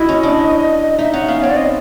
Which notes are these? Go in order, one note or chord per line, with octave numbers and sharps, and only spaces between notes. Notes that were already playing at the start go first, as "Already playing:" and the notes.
Already playing: E4 F#4 D#5
C#4
D4
D#4 E5
C#4 F#5
B3 F5
C4 C#5
D5
D#5